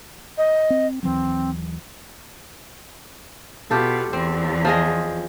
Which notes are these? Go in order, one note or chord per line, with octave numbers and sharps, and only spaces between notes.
D#5
C4
D#2 E3 F#3 C4
B2 F4 G4 A4
E2 C4
F3 G#4 D#5